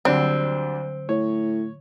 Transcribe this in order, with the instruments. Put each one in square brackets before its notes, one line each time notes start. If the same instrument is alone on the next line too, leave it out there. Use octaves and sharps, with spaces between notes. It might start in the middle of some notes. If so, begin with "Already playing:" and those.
[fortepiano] D2 G3 D4 [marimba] D3 F#3 [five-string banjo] C4
[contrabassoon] A2 [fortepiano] C#5